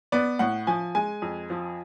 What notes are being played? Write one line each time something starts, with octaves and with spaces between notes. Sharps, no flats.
B3 D5
A2 F#5
F3 G#5
G#3 G#5
F2
F3